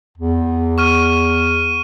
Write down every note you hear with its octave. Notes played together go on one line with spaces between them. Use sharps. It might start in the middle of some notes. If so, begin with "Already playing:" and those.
E2
C#6 F6 D#7